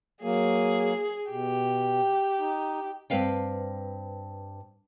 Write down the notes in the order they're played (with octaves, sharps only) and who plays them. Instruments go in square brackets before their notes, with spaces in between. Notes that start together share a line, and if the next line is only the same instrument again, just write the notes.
[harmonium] F#3 A#3 [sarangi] G#4
[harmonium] B2 [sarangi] G4
[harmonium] D#4
[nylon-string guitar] G2 C4 B4 F5 G5